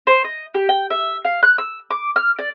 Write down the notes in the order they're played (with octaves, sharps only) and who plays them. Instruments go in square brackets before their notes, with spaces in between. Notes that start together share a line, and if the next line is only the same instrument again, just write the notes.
[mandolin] C5
D#5
G4
G5
E5
F5
F#6
E6
D6
F6
D5